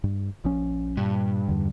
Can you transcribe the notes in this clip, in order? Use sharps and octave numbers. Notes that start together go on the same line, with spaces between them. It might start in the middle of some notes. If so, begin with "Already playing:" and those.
G2
A#1 F3 C#4
G2 A#2
E2 D3